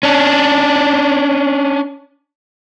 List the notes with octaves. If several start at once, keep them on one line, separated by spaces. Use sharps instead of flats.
C#4 D4